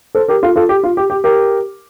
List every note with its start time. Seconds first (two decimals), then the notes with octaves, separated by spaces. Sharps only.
0.15 A4 C5
0.28 G4 A#4
0.42 F4 A4
0.56 F4 A4
0.69 G4
0.83 F4
0.97 G4
1.10 G4
1.24 G4 A#4